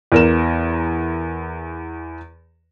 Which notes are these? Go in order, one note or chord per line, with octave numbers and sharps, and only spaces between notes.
E2 A#4 E7